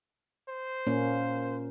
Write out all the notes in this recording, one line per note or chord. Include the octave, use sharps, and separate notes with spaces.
C5
A#2 A#3 C#4